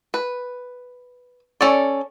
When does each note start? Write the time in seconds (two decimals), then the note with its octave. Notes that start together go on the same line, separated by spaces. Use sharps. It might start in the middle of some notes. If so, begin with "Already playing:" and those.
0.14 B4
1.61 C#4 A4 D5